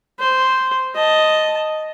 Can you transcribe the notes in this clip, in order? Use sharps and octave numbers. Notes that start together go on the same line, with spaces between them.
C5
D#5 A5